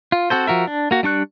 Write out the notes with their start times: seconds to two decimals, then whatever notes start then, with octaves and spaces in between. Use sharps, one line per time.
0.12 F4
0.30 C4 F#4 A4 C5
0.47 F3 F#4 A#4 E5
0.67 D4
0.91 A#3 F#4
1.03 G3 D4 C#6 F#6